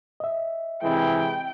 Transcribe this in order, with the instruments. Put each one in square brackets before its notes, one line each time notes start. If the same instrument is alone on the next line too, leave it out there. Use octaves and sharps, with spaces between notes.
[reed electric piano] D#5 E5
[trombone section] C3 G#3 E4 [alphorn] E3 [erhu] G5